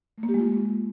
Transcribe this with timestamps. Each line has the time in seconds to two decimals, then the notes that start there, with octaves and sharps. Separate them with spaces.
0.18 A3
0.23 A#3
0.29 G4
0.34 G#3
0.40 F4